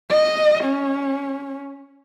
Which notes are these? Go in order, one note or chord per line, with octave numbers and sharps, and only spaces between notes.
D#5
C#4